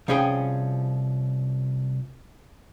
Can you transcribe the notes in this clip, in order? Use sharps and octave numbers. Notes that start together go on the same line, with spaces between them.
C2 F3 C#4 G#4 G5